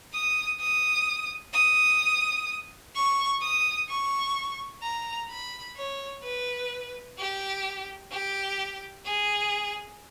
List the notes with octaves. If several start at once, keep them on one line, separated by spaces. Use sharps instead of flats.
D#6
D#6
D#6
C#6
D#6
C#6
A#5
B5
C#5
B4
G4
G4
G#4